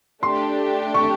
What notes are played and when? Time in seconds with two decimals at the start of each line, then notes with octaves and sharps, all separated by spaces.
0.22 A3 D4 G4 C6
0.94 C#6